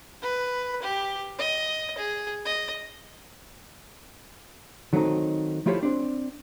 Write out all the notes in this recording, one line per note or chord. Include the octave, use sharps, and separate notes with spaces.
B4
G4
D#5
G#4
D#5
D#3 F#3 A3 C4 C#4 D#4
F3 A3 E4 F4 G4 C#5
C4 D4